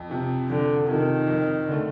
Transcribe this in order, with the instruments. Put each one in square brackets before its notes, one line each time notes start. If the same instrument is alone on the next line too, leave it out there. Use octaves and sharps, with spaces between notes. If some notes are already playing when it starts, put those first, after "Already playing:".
Already playing: [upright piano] F2
C3 F3
[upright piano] F2 [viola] D3
[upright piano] C3 F3 [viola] D#3
[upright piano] F2
D3 A3